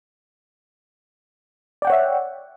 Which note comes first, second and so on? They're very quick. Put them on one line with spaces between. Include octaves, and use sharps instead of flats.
D5 G5 F#5 C#5 E5